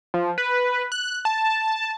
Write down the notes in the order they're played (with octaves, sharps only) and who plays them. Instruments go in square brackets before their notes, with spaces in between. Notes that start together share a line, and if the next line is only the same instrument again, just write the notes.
[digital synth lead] F3
B4
F#6
A5